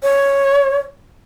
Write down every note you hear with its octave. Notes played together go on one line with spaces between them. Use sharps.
C#5